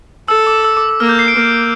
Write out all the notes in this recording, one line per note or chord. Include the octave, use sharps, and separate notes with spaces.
A4 E6
D6
E6
D6
E6
A#3 F6
G6
C7
D7
A#3